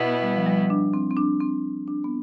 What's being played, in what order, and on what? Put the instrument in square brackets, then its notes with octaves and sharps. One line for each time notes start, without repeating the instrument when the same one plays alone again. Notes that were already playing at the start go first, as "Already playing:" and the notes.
Already playing: [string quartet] B2 B3 E4
[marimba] G3
F3
G3
D4
C4
C4
D4
C4
D4
B3